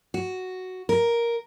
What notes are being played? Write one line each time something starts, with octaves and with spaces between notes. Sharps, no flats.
F#4
A#4